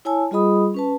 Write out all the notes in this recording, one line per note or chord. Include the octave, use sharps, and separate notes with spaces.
E4 C#5 G#5 A5 E6
G3 F4 G#4 D#5 B5 D#6
C#4 B4 A5